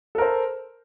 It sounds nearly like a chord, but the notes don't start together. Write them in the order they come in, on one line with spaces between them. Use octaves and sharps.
A4 A#4 C5